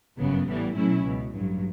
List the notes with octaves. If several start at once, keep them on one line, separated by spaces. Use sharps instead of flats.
G1 F#2 C#3 F#3 B3
A1 A2 E3 G3 B3
B2 F#3 A3 C#4 E4
C#2 B2 F#3
A1 G2 F#3